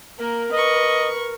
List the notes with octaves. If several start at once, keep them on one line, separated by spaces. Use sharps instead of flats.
A#3 A#4
B4 D#5 C#6